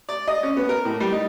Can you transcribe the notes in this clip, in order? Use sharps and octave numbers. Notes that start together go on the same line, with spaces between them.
D5
D#5
C#4
B3
A#4
A2
G3
D#4